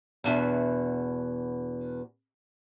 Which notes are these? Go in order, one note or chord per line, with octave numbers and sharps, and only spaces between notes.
E2 B2 D4 E5